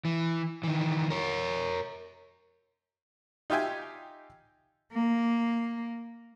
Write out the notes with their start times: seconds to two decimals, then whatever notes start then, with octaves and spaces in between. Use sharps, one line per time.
0.05 E3
0.63 D#3 E3
1.10 A#4 C#5
3.50 D#4 F4 G4 E5 G5 G#5
4.92 A#3